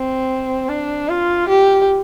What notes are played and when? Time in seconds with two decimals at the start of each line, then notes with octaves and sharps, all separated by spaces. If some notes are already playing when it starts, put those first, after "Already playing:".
Already playing: C4
0.69 D4
1.09 F4
1.48 G4